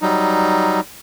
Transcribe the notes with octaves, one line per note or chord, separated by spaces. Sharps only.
F#3 G3 D#4